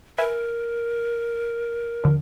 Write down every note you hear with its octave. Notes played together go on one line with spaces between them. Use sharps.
A#4 B4 E5 G#5
D#2 D3 F3